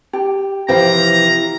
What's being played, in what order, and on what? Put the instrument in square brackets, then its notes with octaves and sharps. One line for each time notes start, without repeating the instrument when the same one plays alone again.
[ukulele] G4
[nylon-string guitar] C3 E3 F3 [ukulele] G4 C5 F5 [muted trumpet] A#5